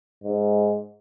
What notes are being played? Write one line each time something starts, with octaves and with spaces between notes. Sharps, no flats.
G#2